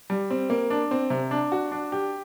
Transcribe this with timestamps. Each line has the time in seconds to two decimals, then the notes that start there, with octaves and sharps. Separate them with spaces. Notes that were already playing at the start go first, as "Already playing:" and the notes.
0.10 G3
0.30 C4
0.50 A#3
0.70 D4
0.91 C4
1.10 C3
1.31 D4
1.52 F#4
1.72 D4
1.92 G4